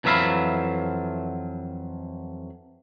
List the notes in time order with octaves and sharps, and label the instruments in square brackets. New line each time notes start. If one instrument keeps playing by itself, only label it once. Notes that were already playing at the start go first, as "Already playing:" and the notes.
[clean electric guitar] F2 E3 F#3 E5 F5 B5